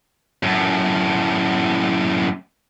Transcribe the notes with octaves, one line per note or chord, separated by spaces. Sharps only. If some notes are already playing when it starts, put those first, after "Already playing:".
F#2 A2